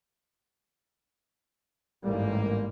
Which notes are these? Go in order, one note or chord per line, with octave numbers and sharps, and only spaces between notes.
A1 G#2 G3 A#3